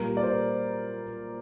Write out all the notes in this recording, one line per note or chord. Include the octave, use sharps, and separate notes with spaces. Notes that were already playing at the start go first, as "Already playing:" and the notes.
Already playing: A#2 G3 A#3 A#4
D5
C5